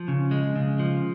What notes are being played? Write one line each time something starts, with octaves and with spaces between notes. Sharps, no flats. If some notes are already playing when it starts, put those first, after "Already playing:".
Already playing: F3
C#3
G#3
C#3
F3